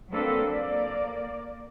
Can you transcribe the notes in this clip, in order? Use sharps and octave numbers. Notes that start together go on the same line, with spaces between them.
F#3 A#3 C4 D4 A4 B4
A#3 D5